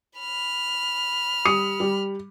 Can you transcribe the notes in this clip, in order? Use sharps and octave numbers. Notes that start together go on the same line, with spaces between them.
B5 F6
G3 D#6 C#7
G3